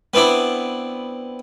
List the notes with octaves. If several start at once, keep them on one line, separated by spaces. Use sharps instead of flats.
B3 C4 D4 E4